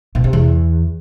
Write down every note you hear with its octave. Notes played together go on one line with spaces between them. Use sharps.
B2
C3
E2